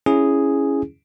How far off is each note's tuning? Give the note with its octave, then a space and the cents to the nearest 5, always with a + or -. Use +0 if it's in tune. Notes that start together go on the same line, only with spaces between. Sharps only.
C#4 +0 E4 +0 G#4 +0